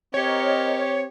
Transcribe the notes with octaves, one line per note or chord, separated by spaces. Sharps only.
C4 G4 A#4 C#5 D#5